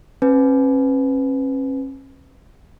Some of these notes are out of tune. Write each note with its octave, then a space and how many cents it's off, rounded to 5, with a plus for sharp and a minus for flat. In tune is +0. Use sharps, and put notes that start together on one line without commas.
C#4 -40 B4 +15 G#5 +35